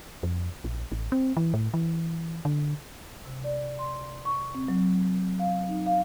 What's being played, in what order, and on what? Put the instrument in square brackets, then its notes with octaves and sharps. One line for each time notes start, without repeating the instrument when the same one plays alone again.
[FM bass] F2
A#1
A1
C4
E3
A2
E3
D3
[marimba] C3
D5
C6
C#6
C4
F#3
F5
D#4
F5